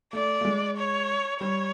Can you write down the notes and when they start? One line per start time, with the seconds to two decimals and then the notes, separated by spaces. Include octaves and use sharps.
0.13 A3 D5
0.41 A3
0.45 G#3
0.77 C#5
1.40 G3 C#5